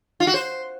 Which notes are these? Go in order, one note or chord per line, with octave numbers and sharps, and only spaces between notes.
F4
F#4
C5